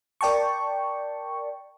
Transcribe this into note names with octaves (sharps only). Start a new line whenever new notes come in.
A#4 D5 G5 A5 C#6